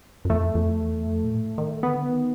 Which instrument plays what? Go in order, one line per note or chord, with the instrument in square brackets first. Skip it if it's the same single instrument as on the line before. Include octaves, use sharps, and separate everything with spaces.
[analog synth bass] F#2
[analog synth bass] F2 [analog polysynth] A3
[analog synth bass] F2
E2
F2
A#2
A2
D#3
[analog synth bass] D3 [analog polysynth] B3
[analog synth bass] D#3